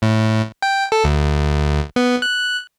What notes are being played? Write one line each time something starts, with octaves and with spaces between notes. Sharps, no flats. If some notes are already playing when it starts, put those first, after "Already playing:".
A2
G5
A4
D2
B3
F#6